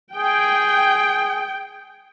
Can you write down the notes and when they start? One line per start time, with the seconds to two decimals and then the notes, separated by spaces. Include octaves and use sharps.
0.16 G#4 G5